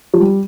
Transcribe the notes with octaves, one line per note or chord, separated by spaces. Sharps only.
F3
G3